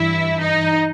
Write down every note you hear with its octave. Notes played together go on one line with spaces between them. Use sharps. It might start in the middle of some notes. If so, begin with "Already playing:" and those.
Already playing: G2 E3 E4 E5
D#4 D#5